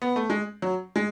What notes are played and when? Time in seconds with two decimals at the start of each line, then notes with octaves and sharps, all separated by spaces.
0.02 B3
0.16 A3
0.30 G#3
0.62 F#3
0.96 G#3